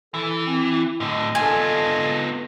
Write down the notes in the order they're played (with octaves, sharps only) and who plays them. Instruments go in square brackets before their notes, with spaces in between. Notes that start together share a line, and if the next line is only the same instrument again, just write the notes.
[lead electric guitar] E3 [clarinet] A4
[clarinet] C4
[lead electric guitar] A2 D3 [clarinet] D#5
[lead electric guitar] B3 F4 [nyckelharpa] D4 A4 [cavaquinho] G#5